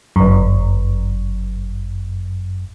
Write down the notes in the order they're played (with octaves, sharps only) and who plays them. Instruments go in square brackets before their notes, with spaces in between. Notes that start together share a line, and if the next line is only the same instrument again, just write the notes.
[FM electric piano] G1 F#2